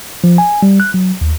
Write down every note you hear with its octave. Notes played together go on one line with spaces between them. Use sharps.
F3
G#5
G3
F#6
F#3
D#2